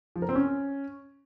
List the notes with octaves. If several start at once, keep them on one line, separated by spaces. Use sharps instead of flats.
F3
A#4
C4
C#4